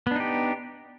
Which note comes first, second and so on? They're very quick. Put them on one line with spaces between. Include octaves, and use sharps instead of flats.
B3 D4 D#4 G4